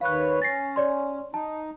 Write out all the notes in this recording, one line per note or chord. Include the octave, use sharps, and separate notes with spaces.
D#2 B4 C#5 F5 F#6
C#4 A6 A#6 C7
C#5 D5 C6
D#4 A5